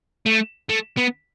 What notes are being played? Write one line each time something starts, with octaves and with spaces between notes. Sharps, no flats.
A3
A3
B3